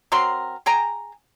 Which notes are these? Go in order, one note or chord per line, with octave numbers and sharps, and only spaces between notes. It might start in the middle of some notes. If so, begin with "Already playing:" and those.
F#3 C4 A#4 C6
G#4 G5 G#5 A#5